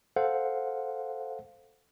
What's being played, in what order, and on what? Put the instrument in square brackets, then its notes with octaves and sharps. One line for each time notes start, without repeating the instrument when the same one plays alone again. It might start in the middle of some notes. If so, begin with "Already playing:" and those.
[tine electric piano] A4 C5 F5 F#5